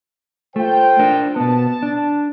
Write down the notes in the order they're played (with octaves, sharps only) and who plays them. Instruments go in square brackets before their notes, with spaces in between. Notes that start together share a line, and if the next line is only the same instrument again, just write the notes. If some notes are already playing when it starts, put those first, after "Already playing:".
[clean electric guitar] A3 [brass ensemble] F4 C5 G5
[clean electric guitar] D4 A#4
[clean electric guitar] B2 B3 [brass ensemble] A5
[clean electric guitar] D4